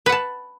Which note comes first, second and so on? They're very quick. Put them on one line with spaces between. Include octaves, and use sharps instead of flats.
B4 F#5 A5